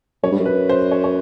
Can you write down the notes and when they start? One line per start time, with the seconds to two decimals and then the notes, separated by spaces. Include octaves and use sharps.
0.23 F#2 C#5
0.31 G2
0.40 F#2
0.46 B4
0.70 C5
0.91 C#5
1.04 C#5